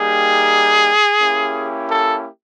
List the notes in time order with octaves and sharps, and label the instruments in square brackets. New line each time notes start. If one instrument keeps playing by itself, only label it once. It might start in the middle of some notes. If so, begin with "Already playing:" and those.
Already playing: [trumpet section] G3 A#3 D#4 G4 G#4
A#3 C#4 E4 G4
A4